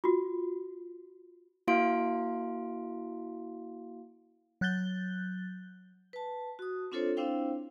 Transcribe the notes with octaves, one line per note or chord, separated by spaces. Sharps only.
F4 F#4
A#3 E4 F#4 F5 C6 D7
F#3 F#6 G6 A6 G7
B4 A5
F#4 D#6
C4 D4 F4 A4 C5 C#5
C4 D4 E4 C5 F5 G5